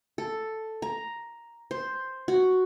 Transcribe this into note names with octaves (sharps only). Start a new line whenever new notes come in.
A4
A#5
C5
F#4